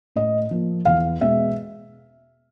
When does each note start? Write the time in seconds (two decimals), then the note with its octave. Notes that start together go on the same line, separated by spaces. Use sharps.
0.16 A2 D#5
0.51 F3 A#3
0.85 E2 F5
1.21 B2 G#3 E5